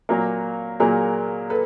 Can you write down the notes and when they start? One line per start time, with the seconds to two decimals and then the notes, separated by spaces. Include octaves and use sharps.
0.09 A#2 F#3 A#3
0.80 A#2 F#3 A#3 G#4 A#4
1.50 A4 B4